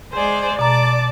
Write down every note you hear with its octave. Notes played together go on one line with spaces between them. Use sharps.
G#3 G#4 C5 D5
B2 D5 A5 A#5 D6